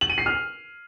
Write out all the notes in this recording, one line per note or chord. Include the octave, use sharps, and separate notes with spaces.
F#7
D#7
C7
F6